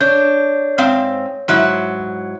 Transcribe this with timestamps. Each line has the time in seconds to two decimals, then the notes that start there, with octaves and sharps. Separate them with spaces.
0.01 D4 C#5 G6
0.78 G#2 C4 F5
1.48 G#2 F#3 E4